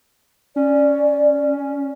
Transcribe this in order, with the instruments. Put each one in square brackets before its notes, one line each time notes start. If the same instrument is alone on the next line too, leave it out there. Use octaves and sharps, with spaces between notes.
[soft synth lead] C#4 [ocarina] D5